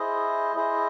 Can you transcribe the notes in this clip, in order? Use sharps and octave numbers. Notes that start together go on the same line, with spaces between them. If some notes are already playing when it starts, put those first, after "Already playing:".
Already playing: E4 G#4 C5 D#5
E4 G#4 C5 D#5